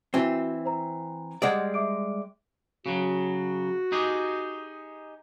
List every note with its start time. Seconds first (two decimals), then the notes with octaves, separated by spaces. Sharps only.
0.14 E3 C4 F#4
0.66 C5 A#5
1.42 G3 G#3 D5 D#5 F#5 G#6
1.74 E5 D6 D7
2.86 C#3 F#3 F#4
3.92 D#4 G4 G#4